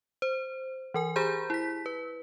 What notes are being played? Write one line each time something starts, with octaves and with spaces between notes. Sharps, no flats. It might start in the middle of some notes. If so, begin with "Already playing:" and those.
C5
E3 A#4 G#5
G4 G#4 C5 A#5 B5 G6
E4 B6
B4